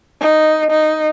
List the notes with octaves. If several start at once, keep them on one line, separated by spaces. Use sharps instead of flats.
D#4
D#4